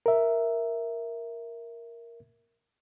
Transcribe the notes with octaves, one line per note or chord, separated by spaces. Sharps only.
A#4 E5